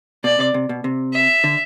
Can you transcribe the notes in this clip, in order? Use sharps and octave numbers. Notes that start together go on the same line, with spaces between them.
B2 D5
C3
C3
B2
C3
E5
D3